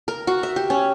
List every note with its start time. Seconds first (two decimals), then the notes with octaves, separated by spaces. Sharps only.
0.08 A#4
0.27 F#4
0.43 E5
0.56 G4
0.70 C#4